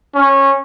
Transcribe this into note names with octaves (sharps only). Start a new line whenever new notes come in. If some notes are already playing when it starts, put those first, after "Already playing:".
C#4